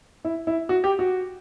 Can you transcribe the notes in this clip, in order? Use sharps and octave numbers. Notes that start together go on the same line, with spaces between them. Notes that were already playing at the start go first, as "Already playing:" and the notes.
E4
E4
F#4
G4
F#4